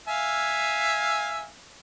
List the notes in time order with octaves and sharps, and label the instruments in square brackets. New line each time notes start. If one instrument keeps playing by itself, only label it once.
[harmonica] E5 F5 G#5